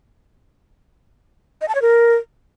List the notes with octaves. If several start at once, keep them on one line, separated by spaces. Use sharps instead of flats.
D#5
A5
C#5
A#4